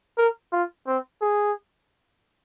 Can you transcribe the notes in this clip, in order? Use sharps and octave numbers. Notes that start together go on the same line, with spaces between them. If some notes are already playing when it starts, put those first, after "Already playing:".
A#4
F4
C4
G#4